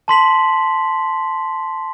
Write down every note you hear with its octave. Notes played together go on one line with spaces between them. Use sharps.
A5 C6 B6 F#7